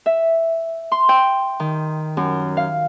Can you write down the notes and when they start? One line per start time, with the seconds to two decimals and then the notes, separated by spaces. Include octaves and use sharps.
0.06 E5
0.92 C6
1.09 G5
1.60 D#3
2.17 F#2
2.57 F5